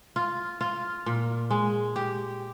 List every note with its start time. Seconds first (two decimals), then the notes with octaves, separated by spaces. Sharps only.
0.16 F4
0.61 F4
1.06 A#2
1.50 G#3
1.96 G4